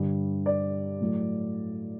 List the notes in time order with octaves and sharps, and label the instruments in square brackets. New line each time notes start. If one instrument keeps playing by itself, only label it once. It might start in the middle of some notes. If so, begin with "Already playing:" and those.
Already playing: [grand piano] G2 D3 G3
D5
A2 F#3 A3